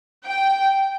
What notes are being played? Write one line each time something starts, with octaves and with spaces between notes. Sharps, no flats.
G5